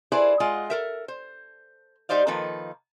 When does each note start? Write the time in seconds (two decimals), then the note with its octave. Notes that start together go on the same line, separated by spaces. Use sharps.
0.12 E4 G#4 A4 B4 C5 D5
0.40 G#3 F4 D#5 F#5
0.70 A4 A#4 E5
1.08 C5
2.09 G3 D#4 C5 D5 F5
2.27 D#3 F3 A#3 D#4 A4 B4